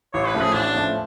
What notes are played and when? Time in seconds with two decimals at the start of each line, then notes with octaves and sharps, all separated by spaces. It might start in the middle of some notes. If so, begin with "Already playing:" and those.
0.13 A1 C#5
0.27 B4
0.34 A2 F3 A3 C#4
0.41 G#4
0.54 A1 D4
0.74 A2 F3 A3 C#4